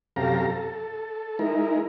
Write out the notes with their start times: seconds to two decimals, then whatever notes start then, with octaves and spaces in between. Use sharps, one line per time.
0.16 F#2 C3 G4 A4 F5 A#5
0.47 A4
1.39 G#3 D#4 E4 A#4